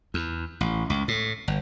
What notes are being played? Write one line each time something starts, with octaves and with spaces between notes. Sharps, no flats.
E2
A1
C#2
A2
G1